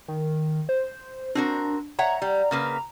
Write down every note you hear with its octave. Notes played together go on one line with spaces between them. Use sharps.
D#3
C5
C4 D4 F#4 A#4
C#5 E5 F#5 A#5
G3
C#3 A#3 B4